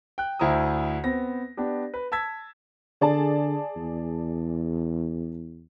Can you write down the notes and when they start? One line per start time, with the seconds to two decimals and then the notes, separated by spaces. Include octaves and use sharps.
0.18 G5 F#6
0.39 D2 E4 C5 A#5 D#6
1.04 B3 C4 A#6
1.57 B3 D4 G4
1.94 B4
2.12 A5 E6 G#6 B6
3.01 D3 G#4 D5 A5
3.76 E2